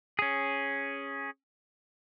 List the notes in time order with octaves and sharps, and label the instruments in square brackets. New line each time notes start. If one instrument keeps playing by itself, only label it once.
[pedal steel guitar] C#4 G#4